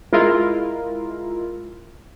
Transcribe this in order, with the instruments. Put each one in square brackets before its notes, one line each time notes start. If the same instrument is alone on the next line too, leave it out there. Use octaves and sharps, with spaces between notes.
[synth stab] G#3 E4 F4 A#4